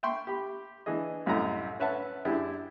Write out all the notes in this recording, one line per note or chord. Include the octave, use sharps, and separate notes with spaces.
E5 G5 C6 C#6
G4 B5
E3 D4 G#4 D#5
C2 F#2 A2 A3 D#5 A#5
C#4 B4 E5 F#5 A5
F#2 D4 E4 G4 G#4